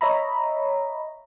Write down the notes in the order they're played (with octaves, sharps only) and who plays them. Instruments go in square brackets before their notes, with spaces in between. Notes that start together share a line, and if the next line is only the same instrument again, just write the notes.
[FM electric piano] C#5 D#5 E5 A#5 B5